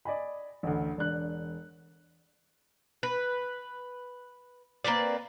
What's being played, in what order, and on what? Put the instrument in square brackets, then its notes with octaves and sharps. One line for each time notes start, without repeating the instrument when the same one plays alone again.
[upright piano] D5 D#5 G#5 B5
A1 D2
E1 D4 F#6
[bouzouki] B4
A#3 C4 B4 D5